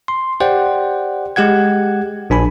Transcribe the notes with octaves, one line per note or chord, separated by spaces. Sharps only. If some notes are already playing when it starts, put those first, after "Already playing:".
C6
G4 C5 D5 F#5 G5
G#3 G4 F#5 G#6
A#1 D4 G#5 B5